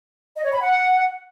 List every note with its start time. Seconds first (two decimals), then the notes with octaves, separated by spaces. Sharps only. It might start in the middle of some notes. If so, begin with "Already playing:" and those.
0.36 D#5
0.45 C#5
0.53 B5
0.61 F#5